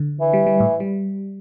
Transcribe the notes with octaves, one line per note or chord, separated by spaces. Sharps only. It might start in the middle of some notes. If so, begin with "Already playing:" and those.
Already playing: D3
E3
G3
G3
A2
G3